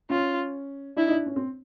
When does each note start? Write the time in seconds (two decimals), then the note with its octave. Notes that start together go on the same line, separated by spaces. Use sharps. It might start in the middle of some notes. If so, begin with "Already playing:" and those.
0.10 C#4 F4
0.96 D4 E4
1.08 D#4
1.11 D4
1.26 C#4
1.36 C4